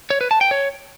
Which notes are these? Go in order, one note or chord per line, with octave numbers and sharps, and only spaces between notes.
C#5
B4
A5
G5
C#5